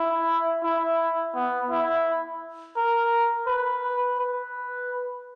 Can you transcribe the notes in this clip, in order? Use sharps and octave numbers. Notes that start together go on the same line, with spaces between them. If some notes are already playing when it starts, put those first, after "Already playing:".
Already playing: E4
E4
B3
E4
A#4
B4
B4